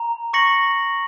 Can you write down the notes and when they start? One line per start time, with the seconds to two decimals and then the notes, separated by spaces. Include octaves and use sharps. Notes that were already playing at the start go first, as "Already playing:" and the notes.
Already playing: A#5
0.33 C#6 A#6 C#7 F#7